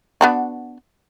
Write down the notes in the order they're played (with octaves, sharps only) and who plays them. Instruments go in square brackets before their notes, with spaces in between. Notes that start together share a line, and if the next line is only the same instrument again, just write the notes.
[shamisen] B3 D4 F#4